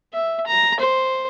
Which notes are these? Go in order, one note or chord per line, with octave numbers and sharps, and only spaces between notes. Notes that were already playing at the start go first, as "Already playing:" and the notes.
E5
A#5
C5